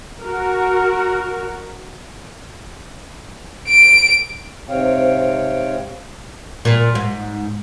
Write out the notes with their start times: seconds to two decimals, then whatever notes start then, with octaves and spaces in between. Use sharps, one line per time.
0.21 F#4 A#4
3.68 D7
4.69 G#2 C3 C4 C#5 F5 G5
6.65 A#2
6.95 G#2